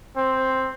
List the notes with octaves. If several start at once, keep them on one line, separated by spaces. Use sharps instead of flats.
C4